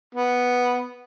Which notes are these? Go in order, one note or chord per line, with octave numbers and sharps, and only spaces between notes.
B3